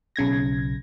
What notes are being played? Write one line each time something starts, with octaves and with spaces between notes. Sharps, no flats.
B1 C#3 G#6 A#6